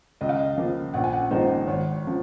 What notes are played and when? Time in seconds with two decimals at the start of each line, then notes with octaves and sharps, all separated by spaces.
0.21 C#2 D#5
0.29 F5
0.37 D#5
0.57 C#3 F3 A#3
0.94 A#1 F#5
1.04 G#5
1.13 F#5
1.31 A#2 F3 G#3 D#4 C5
1.67 G#1 C#5
2.07 F3